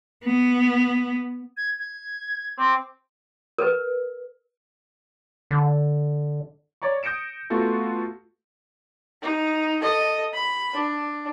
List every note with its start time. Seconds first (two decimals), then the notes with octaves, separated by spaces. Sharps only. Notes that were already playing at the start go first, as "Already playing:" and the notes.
0.25 B3
1.57 G#6
1.79 G#6
2.58 C4 D6
3.58 A#4 B4
5.51 D3
6.82 C#5 D5 A#5 C#6
7.03 D#6 G6 A#6 C#7 D7 E7
7.50 A3 B3 F4 F#4 A4
9.22 D#4
9.82 A4 D#5
10.34 B5
10.73 D4